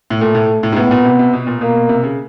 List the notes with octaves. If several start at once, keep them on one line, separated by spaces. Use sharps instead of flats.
A2
A#2 A3
A2
A2
G#2
A2 B3
A#2
C3
C3
B2
A#2
B2 A#3
C3
C#3